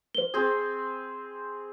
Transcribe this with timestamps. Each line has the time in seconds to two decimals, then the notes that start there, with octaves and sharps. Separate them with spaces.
0.15 C5 G7
0.34 C4 G#4